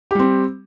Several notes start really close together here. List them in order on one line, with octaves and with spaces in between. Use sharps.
G4 G3 C4